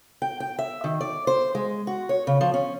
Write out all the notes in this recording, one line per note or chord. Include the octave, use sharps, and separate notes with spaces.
G5
G5
E5
D#3
D5
C5
G#3
F#4
C#5
C#3
F3
C#4